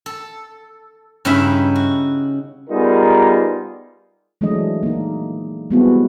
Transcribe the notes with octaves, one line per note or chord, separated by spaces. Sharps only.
A4
G2 C#3 C#4 D#4 E4 E5
F#4
G3 B3 D#4 F4 G#4 A#4
E3 F#3 G#3 A3 D4 D#5
A#3 D#4
G3 G#3 B3 C4 E4 F#4